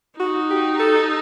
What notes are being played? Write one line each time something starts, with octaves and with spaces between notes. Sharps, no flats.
D#4 F#4
G4
A4